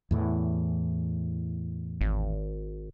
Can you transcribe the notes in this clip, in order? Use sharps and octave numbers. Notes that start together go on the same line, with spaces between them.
E2 A2 E3
G#1